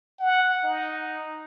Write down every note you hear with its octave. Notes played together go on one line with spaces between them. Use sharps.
F#5
D#4